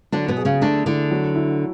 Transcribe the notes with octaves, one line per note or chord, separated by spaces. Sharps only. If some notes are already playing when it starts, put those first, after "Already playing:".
D3 F#3 D4
B2 B3
G#4
C#3 C#4
D3 A3 D4
D3 D4 E4
F#3
E4